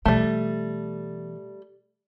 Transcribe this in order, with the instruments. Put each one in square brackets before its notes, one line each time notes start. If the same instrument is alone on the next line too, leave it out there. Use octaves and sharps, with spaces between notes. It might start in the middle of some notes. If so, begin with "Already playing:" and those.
[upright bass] B2 E3 [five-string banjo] G3 A3